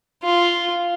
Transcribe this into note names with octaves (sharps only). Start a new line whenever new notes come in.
F4